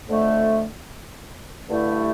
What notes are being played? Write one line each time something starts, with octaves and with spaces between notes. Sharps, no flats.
F2 D3 A3
G2 D3 A3 E4